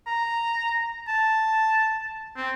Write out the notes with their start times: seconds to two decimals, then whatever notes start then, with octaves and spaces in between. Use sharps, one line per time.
0.07 A#5
1.08 A5
2.37 C4